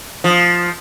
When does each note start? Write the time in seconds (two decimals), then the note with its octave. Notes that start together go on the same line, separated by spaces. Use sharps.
0.24 F3